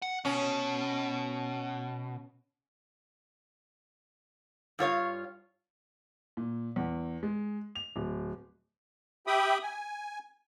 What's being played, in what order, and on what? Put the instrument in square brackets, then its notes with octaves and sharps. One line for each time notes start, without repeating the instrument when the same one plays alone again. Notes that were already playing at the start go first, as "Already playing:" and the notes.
[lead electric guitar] F#5
[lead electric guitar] B2 [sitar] C#4
[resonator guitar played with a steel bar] G2 F4 C#5 F5
[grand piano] A#2
E2
G#3
F7
D1
[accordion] G4 E5 G5 B5 D#6
G#5